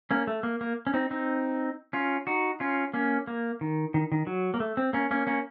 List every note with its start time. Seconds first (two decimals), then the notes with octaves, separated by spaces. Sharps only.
0.11 A#3 C#4
0.27 A3
0.43 A#3
0.61 A#3
0.87 C#4
0.94 C4 D#4
1.11 C4 D#4
1.93 C#4 F4
2.27 D#4 F#4
2.60 C#4 F4
2.94 A#3 C#4
3.27 A#3
3.61 D#3
3.94 D#3
4.12 D#3
4.27 F#3
4.54 A#3
4.60 A3
4.77 C4
4.93 A#3 C#4
5.11 A#3 C#4
5.27 A#3 C#4